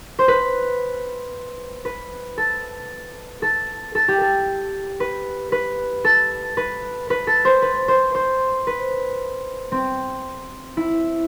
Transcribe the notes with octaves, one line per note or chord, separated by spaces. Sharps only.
C5
B4
B4
A4
A4
A4
G4
A4
B4
B4
A4
B4
B4
A4
C5
B4
C5
C5
B4
C4
E4